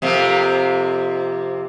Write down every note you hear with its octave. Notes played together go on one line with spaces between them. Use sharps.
F2 C3 A#3